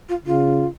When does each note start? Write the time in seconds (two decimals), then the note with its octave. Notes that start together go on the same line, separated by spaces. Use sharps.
0.09 F4
0.26 C#3 F4